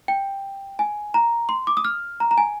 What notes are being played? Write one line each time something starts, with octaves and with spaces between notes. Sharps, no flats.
G5
G#5
A#5
C6
D6
D#6
F6
A#5
A#5
G#5